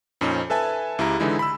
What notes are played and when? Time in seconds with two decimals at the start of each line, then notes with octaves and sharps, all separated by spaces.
0.21 F2 A#2 C4 C#4 D#4
0.50 A4 B4 E5 G#5 A5
0.99 C#2 E4 G4 A#5
1.20 D3 E3 G#3 D#4 E4
1.39 B5 E6